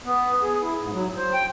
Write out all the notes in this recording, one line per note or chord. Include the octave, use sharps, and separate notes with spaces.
B3
G#4
E4
G#2
F#3
C5
G5